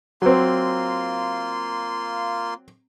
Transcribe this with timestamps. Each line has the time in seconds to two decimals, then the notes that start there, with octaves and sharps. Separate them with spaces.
0.22 F#3 A#3 C4 F4 C6